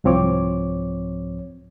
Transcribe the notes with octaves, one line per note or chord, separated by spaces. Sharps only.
C2 G#2 F3 C4 C#5 D6